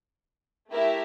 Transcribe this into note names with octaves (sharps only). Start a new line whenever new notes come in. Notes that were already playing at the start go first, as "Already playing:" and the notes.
A3 E4 G4 A#4 E5